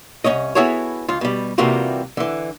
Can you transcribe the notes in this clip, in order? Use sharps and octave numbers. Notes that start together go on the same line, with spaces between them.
C2 C#4 C#5 D#5
B3 E4 F#4 G#4 A4 C#5
C#2 F4
B2 G3
C3 E3 G3 A#3 F4 F#4
D3 E3